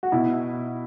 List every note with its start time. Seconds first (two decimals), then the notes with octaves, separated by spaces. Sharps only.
0.03 F#4
0.12 B2 E4